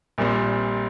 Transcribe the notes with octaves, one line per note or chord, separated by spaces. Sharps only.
A#1 A#2 G3 C4